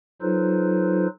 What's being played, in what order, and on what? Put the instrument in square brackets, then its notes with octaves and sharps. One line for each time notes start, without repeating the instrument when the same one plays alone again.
[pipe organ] F#3 D#4 F4 A4 B4 C5